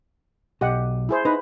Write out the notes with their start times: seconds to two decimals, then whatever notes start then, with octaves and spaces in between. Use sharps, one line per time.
0.61 B1 G4 D#5 F#5
1.09 E4 G#4 C5
1.25 D#4 B4